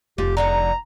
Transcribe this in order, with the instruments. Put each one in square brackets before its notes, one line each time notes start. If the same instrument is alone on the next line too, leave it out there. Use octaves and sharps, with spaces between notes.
[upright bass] F1 F3 [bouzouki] F4 [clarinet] G4
[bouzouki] D3 D#4 F#5 [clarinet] A#5